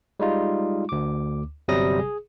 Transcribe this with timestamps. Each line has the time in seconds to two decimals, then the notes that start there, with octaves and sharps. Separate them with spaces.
0.20 G3 G#3 D#4 F4
0.89 D2 D6
1.68 G1 C3 F#3 G3 D#6 A#6
1.99 G#4